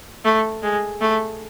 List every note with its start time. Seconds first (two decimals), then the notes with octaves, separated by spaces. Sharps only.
0.25 A3
0.63 G#3
1.01 A3